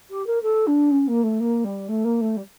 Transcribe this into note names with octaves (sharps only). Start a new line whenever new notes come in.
G4
A#4
A4
D4
C#4
A#3
A3
A#3
G3
A3
A#3
A3
G3